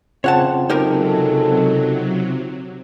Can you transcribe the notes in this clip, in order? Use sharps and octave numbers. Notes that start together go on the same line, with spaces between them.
C#3 C4 F4 C#5 F#5 A5
C3 F#3 G#3 D#4 G4 A4 A#4